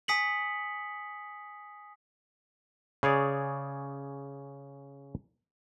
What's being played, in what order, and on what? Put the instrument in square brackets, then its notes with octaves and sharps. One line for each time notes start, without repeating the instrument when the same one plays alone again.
[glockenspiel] G#5 D#6 B6 C#7 F#7
[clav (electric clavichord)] C#3 G#4 C#5 D5